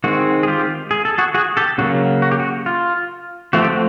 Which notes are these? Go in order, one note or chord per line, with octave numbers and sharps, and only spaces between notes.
D#3 G#3 C4 F#4
G#4
F4 G4
G#4
A4
F#4 G#4
F#4 G#4
G4 A4
C#3 F#3 A#3 C#4 F#4
F#4
G4
F#4
F4
F3 A3 C4 F#4
G4
F#4